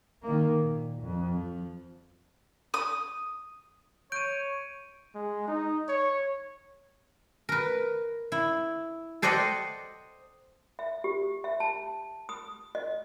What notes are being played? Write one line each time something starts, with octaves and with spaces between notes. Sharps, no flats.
D#3 A#3
A#2
F2
F3
D#6
C#5 G6 D7 D#7
G#3
D#4
C#5
A#4 B4
E4
A4 C5 D5 D#5 F#5 G5
E5
G4
E5
A5
D#6
D#5